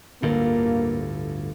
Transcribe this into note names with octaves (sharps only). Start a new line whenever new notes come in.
G1 D2 A2 A#3